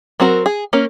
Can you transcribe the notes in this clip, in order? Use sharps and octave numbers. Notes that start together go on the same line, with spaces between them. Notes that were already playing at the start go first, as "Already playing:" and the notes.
F#3 C4 F#4 A#4
G#4
A#3 C#4 A#4